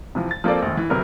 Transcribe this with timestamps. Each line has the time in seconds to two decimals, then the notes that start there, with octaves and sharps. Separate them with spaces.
0.15 C3 E3 F3
0.31 A6
0.44 F3 A#3 C4 A4 D5
0.62 A#1 D#2
0.77 E3
0.90 D2 C3 F#3 A#4 B4